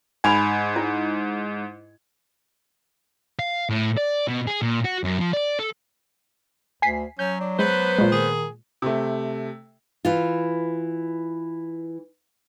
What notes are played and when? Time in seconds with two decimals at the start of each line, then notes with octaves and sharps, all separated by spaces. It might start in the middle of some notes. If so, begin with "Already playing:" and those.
0.24 G#2 G#5 B5 G#6
0.76 E4
3.39 F5
3.69 A2
3.98 D5
4.27 B2
4.47 G#4
4.62 A#2
4.84 F#4
5.04 F#2
5.19 F3
5.33 D5
5.59 A4
6.82 D2 G#5 B6 C7
7.19 F#3 C#4 G6
7.41 D4
7.59 G#3 B3 B4 C5
7.99 A#2 G#3
8.12 D#3 G#4
8.82 C3 A3
10.05 E3 F4